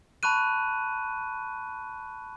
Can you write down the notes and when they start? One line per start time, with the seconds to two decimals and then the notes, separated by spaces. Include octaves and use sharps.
0.23 A5 B5 C#6 F#6 D#7